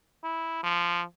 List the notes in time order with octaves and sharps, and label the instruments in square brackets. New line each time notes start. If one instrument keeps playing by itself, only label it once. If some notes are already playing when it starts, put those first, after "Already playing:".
[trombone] E4
F3